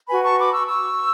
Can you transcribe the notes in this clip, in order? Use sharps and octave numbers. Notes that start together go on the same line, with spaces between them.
F#4 B4 G#5 B5
A5 C#6
B5 D6
C#6 E6
C#6 E6